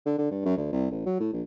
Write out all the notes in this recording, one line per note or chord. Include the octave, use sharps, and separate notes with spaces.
D3
D3
G2
F#2
D2
C2
A1
F#3
A2
A#1